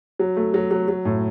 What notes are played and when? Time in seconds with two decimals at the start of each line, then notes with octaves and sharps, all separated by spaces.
0.19 F#3
0.37 A3
0.54 F#3
0.71 F#3
0.88 F#3
1.05 A2